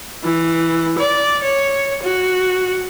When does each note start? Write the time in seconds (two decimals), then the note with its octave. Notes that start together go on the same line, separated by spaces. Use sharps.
0.23 E3
0.98 D5
1.43 C#5
2.02 F#4